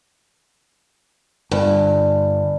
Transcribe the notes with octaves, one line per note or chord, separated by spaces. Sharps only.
G1 G2